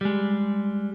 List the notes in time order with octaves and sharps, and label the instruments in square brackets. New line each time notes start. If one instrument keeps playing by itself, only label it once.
[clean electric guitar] G3 G#3